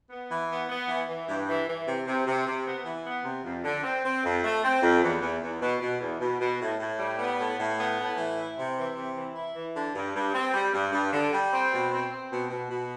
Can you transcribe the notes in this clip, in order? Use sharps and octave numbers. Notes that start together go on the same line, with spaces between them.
B3
E3
B3
B3
E3
E3
G2
E3
E3
C3
C3
C3
C3
B3
E3
B3
C3
F2
D3
C4
C4
F2
A3
C4
F2
E2
E2
E2
B2
B2
E2
B2
B2
A2
A2
G3
B3
A2
A2
B3
A2
E3
E4
C3
E3
C3
E3
E4
E3
D3
G2
G2
C4
G3
G2
G2
D3
G3
C4
B2
C4
C4
B2
B2
B2